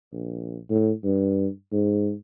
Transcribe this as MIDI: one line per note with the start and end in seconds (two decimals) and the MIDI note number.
0.13 0.57 34
0.70 0.91 45
1.04 1.47 43
1.72 2.12 44